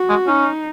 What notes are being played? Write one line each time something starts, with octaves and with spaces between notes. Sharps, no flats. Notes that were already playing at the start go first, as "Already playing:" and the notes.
Already playing: F#4
G#3
C#4 D#4